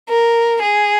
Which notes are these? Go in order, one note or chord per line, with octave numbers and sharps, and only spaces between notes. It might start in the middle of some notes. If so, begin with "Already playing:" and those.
A#4
G#4